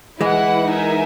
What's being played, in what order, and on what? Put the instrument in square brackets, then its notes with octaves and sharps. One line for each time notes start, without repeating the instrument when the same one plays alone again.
[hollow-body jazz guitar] E3 G#3 [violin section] E4 B4 F#5
[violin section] D#4 A#4 E5 G#5